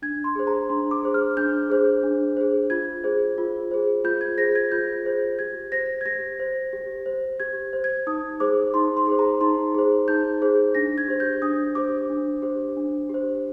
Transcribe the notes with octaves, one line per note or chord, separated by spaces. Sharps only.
D4 G#6
C6
G#4 C5
A#5
D4 C6
D6
G#4 C5
F6
D4 G6
G#4 C5
D4
G#4 C5
F4 G#6
G#4 C5
F4
G#4 C5
F4 G6
G#6
G#4 C5 A#6
G#6
F4 G6
G#4 C5
G4 G#6
C5 A#6
G#6
G4 A#6
C5
G4
C5
G4 G#6
C5
G#6
D#4 D#6
G#4 C5 D6
D#4 C6
C6
G#4 C5
A#5
D#4 C6
G#4 C5
D#4 G6
G#4 C5
D4 A#6
G#6
G4 C5
G6
D4 D#6
G4 C5 D6
D4
G4 C5
D4
G4 C5